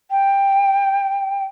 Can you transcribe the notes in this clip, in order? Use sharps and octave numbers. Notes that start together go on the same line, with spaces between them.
G5